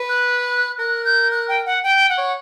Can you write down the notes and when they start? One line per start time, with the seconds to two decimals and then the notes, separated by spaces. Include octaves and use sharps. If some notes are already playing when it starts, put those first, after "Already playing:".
Already playing: B4
0.09 F#6
0.79 A#4 F#6
1.05 G6
1.31 F#6
1.48 G5
1.66 F#5
1.83 G5
2.09 F#5
2.18 C#5